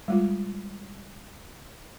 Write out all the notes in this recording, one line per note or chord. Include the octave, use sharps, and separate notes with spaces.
G3 G#3 F4